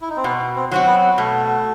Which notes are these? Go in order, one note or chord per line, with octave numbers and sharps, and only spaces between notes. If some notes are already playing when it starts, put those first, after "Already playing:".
E4
D#4
C4
B2 B3
C4
F#3 C4 F#4
B3
B2 A3